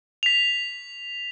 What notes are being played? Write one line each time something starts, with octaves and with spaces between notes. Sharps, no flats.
B6 F7